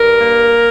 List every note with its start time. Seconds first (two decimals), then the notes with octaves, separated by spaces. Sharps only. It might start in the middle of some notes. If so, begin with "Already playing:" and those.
Already playing: G2 A#4
0.19 A#3